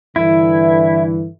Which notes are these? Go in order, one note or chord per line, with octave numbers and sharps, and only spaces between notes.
G2 D3 E3 E4